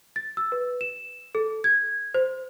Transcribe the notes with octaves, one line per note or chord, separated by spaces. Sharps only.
A6
E6
B4
E7
A4
G#6
C5